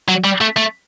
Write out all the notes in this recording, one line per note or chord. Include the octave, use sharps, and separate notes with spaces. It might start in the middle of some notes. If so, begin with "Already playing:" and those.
F#3
G3
A3
A3